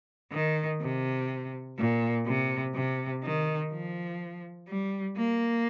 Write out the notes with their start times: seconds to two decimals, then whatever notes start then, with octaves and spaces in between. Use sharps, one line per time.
0.32 D#3
0.81 C3
1.78 A#2
2.26 C3
2.75 C3
3.23 D#3
3.72 F3
4.68 G3
5.17 A#3